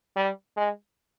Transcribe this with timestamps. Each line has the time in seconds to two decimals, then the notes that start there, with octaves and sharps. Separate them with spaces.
0.16 G3
0.57 G#3